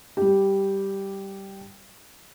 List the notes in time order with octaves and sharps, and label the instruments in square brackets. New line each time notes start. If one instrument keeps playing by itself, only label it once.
[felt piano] G3 G4